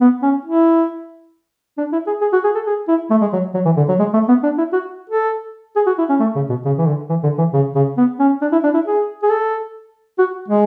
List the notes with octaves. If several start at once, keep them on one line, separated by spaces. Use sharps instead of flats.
B3
C#4
E4
D4
E4
G#4
G#4
F#4
G#4
A4
G#4
E4
A3
G#3
F#3
F#3
E3
D3
F#3
G#3
A3
B3
D4
E4
F#4
A4
G#4
F#4
E4
C#4
A3
C#3
B2
C#3
E3
D3
E3
D3
E3
C#3
C#3
B3
C#4
D4
E4
D4
E4
G#4
G#4
A4
F#4
G#3